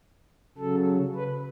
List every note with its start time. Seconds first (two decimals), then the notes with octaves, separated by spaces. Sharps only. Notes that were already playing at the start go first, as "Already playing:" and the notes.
0.58 C#3 F#3 A4
1.15 B4